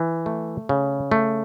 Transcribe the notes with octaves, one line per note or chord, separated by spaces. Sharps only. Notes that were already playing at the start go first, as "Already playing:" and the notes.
Already playing: E3
A3
C#3
A3